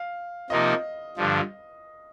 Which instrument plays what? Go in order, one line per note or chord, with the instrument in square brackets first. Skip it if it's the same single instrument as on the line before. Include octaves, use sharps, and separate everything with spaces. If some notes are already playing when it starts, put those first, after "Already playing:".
Already playing: [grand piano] F5
[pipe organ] C3 F3 A#3 D#4 [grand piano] D#5
[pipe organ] G2 D3 F3